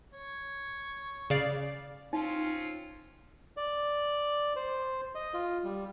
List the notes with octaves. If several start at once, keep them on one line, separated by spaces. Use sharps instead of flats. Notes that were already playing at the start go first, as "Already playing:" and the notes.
C#5
C#3 D5 F5
C4 C#4 D#4 F4
D5
C5
D#5
F4
G3